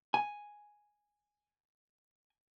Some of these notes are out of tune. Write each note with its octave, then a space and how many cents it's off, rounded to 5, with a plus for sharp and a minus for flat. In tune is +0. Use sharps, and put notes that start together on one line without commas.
G#5 +0